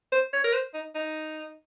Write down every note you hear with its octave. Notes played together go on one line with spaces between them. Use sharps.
C5
C#5
A#4
C5
D#4
D#4